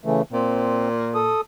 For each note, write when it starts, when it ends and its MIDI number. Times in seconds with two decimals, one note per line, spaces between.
0.05 0.22 49
0.05 0.22 52
0.05 0.22 57
0.33 1.35 46
0.33 0.89 60
1.15 1.41 69
1.15 1.41 87